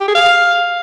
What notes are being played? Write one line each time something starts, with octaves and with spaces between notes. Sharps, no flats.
G4
G#4
F5